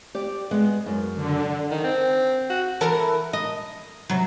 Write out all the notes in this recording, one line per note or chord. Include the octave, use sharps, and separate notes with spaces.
G4 D5
G#3 B3
F#2
D3
D#3
C4
F#4
E3 A4 A#4
D#5
C3 F#3